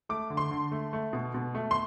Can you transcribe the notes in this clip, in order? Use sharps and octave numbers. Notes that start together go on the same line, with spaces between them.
A3 D6
D3
C6
D3
A3
A3
B2
B2
A3
C6